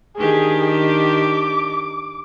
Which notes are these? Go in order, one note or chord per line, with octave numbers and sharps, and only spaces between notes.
D#3 D4 G4 G#4
D6